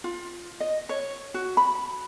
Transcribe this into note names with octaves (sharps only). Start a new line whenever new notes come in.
F4
D#5
C#5
F#4
B5